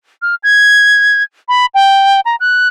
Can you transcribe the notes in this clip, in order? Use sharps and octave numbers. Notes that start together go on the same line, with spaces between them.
F6
G#6
B5
G5
A#5
F#6